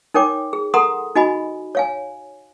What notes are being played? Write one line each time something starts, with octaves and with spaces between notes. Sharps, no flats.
D#4 A#4 C#5 G5 D6
G#4
A4 A#4 F#5 A#5 C6 D#6
D#4 F#4 D#5 G#5 B5
C#5 F5 G#5